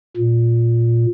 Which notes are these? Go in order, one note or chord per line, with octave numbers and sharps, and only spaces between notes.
A#2